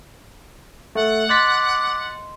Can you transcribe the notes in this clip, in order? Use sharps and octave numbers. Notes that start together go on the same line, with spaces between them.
A3 F#5
D#5 C6 D6 F#6 A6 B6